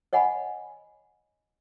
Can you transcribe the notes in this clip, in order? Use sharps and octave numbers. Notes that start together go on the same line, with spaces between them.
C#5 D#5 F#5 G#5 B5